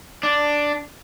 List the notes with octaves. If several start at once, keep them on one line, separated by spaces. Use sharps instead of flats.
D4